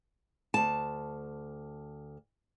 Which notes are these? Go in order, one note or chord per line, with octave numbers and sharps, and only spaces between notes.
D2 A5